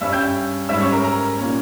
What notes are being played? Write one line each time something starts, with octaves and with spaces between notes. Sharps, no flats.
G2 G3 C#4 E5 E6
G5 G6
G#2 G3 C#4 E5 E6
C#5 C#6
A#4 A#5
A#4 A#5
A#2 A#3 C#4